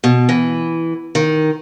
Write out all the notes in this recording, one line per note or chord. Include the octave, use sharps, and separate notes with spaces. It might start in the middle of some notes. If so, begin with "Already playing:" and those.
B2
E3
D#3